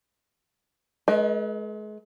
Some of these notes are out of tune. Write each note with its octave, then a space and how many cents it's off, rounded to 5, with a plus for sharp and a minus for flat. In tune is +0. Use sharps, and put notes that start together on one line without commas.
G#3 +40 B4 -40 D#5 +0